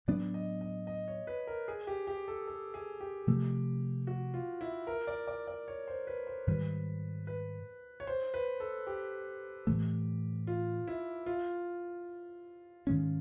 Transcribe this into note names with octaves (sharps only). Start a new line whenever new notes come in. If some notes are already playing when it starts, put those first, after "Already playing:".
A2 F#3 B3 D4 D5
D#5
D#5
D#5
C#5
B4
A#4
G#4
G4
G4
A4
A4
G#4
G4
C3 F3 A3
F#4
F4
E4
A#4
D5
D5
D5
C#5
C5
B4
C5
G#2 D#3 G3 B4
B4
C#5
C5
B4
A4
G4
A2 E3 A3
F4
E4
F4
G#2 D#3 G#3 C#4